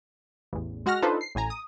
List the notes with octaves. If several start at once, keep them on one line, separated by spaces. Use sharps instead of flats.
A1 E2
G#3 F#4 F#5 F6 A#6
D4 D#4 F4 A4 B4 C5
C7
A1 A2 G#5 A#5
D#6